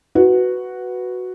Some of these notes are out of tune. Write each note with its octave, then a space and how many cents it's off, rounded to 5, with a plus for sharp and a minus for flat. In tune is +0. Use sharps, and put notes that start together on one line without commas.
F#4 +0 B4 +0